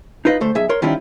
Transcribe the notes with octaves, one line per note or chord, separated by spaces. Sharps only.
D#4 F4 B4 D#5
D2 A3 C5
B1 G#4 E5
A#4 C#5 C6
D#3 F3 G3 C#4 E4 F4